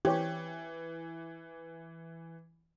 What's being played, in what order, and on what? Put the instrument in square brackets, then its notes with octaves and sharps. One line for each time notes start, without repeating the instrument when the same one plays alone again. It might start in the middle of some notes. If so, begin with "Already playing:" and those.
[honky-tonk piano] E3 [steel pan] G4 C#5